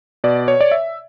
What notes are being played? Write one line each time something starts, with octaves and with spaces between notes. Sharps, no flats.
B2 D5
C#5
D5
E5